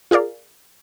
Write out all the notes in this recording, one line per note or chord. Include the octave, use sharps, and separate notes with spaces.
F4 G#4 A#4 D5 F5